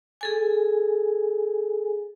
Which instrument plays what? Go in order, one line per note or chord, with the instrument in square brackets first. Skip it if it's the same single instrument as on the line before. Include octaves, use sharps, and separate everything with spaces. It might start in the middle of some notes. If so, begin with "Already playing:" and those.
[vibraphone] G#4 A4 G#5